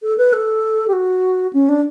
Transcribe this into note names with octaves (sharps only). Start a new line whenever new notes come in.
A4
B4
A4
G4
F#4
C#4
D4